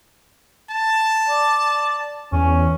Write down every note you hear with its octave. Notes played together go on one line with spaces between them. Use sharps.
A5
D5
E2 C#4